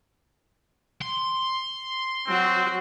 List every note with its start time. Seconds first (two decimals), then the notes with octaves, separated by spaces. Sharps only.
1.02 C6
2.27 F#3 C4 F#4